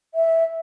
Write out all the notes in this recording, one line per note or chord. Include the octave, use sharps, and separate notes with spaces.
E5